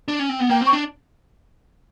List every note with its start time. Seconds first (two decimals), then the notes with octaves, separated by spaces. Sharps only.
0.08 D4
0.19 C#4
0.29 C4
0.40 B3
0.50 A#3 G5
0.61 C4
0.66 C#6
0.73 D4